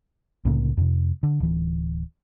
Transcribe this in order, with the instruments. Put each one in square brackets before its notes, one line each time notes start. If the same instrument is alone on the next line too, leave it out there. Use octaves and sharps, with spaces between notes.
[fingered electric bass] C2 A2 C#3 A#3
F2 C3
D3
D1 E3